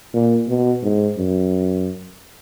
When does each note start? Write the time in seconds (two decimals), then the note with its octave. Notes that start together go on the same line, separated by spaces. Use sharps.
0.14 A#2
0.48 B2
0.83 G#2
1.18 F#2